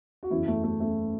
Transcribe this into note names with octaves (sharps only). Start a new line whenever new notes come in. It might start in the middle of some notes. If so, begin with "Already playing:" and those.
F#4
F#1 E2 C#3 E3 E4
A3
A3
A3